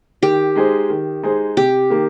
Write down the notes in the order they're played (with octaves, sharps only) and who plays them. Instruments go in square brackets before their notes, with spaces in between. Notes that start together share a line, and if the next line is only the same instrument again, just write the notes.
[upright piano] D#3 [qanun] G4
[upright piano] G#3 D#4 G#4 C5
D#3
G#3 D#4 G#4 C5
[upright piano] C3 [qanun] G4
[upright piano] D#3 A#3